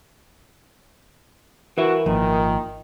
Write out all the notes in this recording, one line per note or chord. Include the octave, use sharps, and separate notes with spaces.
E3 F#4 A#4 B4 E5
G#1 A#2 D#3 F3